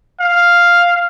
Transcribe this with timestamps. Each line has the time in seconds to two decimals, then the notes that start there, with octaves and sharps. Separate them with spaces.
0.20 F5